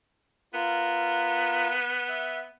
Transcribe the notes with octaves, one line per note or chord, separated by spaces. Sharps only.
B3 F4 A#4
E5